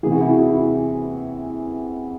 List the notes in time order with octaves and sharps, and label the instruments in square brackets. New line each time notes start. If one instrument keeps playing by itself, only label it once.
[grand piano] C3 E3 G#4
F#4
E4
F#4
E4